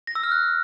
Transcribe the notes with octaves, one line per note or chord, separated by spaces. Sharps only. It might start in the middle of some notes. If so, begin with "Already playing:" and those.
A#6
E6
F6
F#6